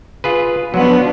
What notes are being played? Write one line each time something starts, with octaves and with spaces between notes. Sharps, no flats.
F4 G#4 B4
F3 F#3 B3 D4 B4 F#5